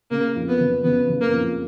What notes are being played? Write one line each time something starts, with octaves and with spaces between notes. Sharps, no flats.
C#3 A#3
F2
B3
F#1
F#1 B3
F#1
A#3
F2